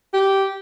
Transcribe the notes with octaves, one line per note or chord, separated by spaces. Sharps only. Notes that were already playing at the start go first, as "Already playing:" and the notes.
G4